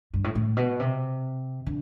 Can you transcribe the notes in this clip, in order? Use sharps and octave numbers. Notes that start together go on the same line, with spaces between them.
G2
A2
A2
B2
C3
D3